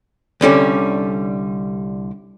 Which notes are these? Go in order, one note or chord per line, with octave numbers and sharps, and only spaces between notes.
C2 D3 G3 C#4